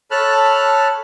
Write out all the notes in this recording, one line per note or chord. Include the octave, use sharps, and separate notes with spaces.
A4 C#5 A5 B5 F6 F#6